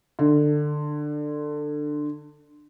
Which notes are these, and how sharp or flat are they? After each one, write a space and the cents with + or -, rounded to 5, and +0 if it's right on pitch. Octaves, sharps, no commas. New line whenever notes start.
D3 +20